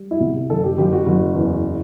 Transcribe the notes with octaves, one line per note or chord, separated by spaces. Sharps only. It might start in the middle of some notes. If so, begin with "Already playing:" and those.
Already playing: G3
E4
C2
F#1 A4
G4
F#1 G4
F#4
F#1
E2